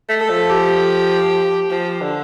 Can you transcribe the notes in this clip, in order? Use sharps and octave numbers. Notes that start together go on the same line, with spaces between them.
A3
A4
F3
G4
F3 G4
D3